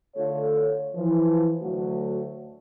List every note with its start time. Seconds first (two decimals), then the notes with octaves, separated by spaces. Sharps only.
0.16 D3 A3 F4 A4 C#5
0.96 E3 F3
1.61 D2 F#3 A3 F#4